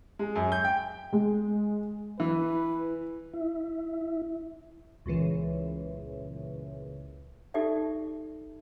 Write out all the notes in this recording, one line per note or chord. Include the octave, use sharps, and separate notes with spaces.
G#3
F#2
G6
G5
G#3
E3 E4 B4
E4
C#2 A#2 C#3 E3
D#4 F#4 G4 A4 D5 E5